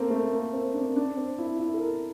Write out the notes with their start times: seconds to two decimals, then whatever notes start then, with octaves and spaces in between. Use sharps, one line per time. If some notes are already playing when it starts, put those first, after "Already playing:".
Already playing: A#3 C4 A4
0.10 A3
0.32 A#3
0.53 C4
0.74 D4
0.96 D4
1.17 C4
1.38 E4
1.59 E4
1.74 A4
1.81 A#4